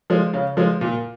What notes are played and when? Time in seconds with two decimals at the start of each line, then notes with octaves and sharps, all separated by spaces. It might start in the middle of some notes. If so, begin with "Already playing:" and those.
0.10 F3 G#3
0.34 C#3
0.57 F3 G#3
0.81 A#2